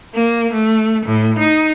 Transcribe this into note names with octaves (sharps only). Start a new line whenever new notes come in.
A#3
A3
A2
D#4